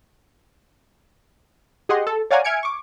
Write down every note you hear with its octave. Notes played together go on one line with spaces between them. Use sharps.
G4 G#4 D#5 F#5 C6
A4
C#5 D5 F5 F#5 G#5 A#5
E5 G#5 F6 G#6 C#7 D7
C#6 D6